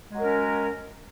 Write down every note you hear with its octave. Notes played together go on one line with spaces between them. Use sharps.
F#3 G#3 C#4 A#4